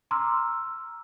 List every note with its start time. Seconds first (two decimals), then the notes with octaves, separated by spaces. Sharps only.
0.11 A#5 C6 D6 E6 F6